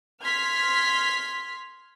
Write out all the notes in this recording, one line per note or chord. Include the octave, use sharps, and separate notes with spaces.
C6 F6 G#6 B6